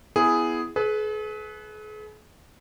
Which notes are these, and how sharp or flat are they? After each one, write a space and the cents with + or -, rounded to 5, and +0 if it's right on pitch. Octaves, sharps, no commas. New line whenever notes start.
B3 +15 E4 +10 G#4 +0
G#4 +45 B4 +0